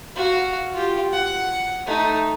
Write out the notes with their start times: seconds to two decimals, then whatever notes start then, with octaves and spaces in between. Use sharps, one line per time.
0.16 F#4 F5
0.74 F4 G4
1.12 F#5
1.86 A3 D#4